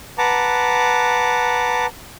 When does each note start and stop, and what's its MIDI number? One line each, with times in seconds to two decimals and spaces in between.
0.18 1.86 71
0.18 1.86 78
0.18 1.86 81
0.18 1.86 82
0.18 1.86 86